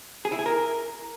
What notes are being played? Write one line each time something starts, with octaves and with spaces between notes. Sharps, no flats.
G#4
E4
G#4
A#4